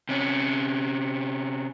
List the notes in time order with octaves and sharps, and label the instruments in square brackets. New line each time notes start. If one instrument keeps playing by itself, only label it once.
[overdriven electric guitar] C3 C#4